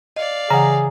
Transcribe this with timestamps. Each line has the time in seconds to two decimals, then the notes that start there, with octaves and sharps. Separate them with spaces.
0.16 D5 D#5 F5
0.50 C#3 E3 G#4 F#5 A#5